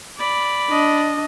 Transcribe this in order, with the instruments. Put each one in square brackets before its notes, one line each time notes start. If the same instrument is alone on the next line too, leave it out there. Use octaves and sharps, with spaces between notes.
[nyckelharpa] D5 B5
[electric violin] D4 D#5